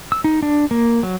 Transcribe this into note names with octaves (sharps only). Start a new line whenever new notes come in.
E6
D#4
D4
A#3
F#3